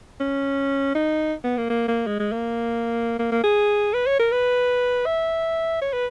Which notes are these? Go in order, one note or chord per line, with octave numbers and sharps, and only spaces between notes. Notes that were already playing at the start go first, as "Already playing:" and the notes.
C#4
D#4
B3
A#3
A#3
A#3
G#3
G#3
A#3
A#3
A#3
G#4
B4
C#5
A#4
B4
E5
C#5
B4